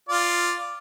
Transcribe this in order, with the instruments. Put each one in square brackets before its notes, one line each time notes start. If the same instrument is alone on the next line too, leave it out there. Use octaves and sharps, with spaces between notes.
[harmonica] F4 D5